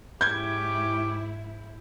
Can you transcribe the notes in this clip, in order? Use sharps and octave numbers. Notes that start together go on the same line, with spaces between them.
G#2 C#4 E4 G4 D6 G6 G#6